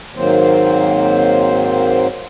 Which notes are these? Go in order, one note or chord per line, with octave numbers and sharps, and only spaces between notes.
G#2 D#3 F#3 A#3 C4 C5